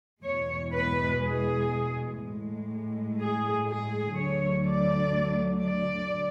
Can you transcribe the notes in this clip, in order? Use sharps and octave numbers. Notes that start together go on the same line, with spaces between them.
E2 B2 G#3 C#5
B4
G#4
A2 G#3
G#4
G#4
D2 D3 F#3 C#5
D5
D5